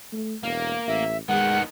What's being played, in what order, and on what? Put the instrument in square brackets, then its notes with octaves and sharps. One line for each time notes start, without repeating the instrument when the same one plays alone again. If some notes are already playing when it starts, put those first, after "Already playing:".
[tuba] A3
[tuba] E1 [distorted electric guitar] A#3
[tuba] A1 [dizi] E5
[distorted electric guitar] D#3 B3 [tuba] G#3 [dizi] F#5